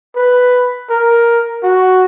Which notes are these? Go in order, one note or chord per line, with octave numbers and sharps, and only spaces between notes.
B4
A#4
F#4